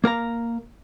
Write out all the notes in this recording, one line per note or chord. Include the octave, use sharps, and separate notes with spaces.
A#3 A#4 F5 A#5